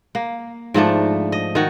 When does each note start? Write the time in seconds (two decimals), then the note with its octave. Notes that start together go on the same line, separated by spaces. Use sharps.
0.15 A#3
0.74 G#2 F3 A3 D4
1.32 D#5
1.55 D#3 F#4